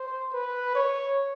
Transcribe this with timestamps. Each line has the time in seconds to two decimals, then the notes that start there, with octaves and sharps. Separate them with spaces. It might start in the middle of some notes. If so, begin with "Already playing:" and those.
Already playing: C5
0.32 B4
0.75 C#5